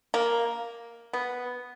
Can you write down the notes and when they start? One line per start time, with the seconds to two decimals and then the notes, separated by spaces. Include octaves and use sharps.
0.14 A#3
1.13 B3